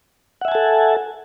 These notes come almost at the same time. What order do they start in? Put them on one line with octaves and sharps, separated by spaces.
F#5 E5 G#5 A5 A4